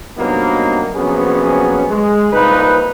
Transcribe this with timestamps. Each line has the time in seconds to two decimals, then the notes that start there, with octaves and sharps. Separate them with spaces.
0.18 G2 C3 F#3 A#3 B3 D#4
0.94 A#1 C3 F#3 B3 C#4 G#4
1.90 G#3
2.33 C2 A#2 A#3 D#4 B4